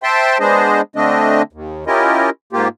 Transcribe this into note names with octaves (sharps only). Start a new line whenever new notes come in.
C5 E5 G5 A5 C6
G#3 B3 D4 G#4 C5 D#5
D3 A3 C4 D4 D#5
D#2
C#4 E4 F4 G4 A#4 D#5
G#2 A#3 F4 G4